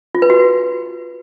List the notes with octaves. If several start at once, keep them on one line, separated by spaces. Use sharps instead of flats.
F4
B4
F#4